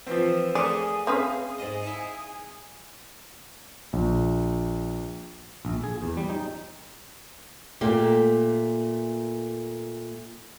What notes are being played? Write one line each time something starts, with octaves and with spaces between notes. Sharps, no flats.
E3 F3 C4
A3 A#3 G#4 C#5 D5
C4 C#4 B4 E5 F5 D#6
G#2 D#5
D#4 E4
A#1
A#1
G#4
E2
G3
D#4
A#2 A3 A#3 G4